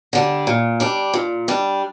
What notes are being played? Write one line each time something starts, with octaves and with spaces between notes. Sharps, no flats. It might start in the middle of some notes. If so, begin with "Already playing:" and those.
D3 G3 D4
A#2
G3 D4
A#2
G3 D4